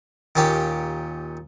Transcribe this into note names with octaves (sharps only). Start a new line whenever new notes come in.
D#2 A#2 C#4 G4 G5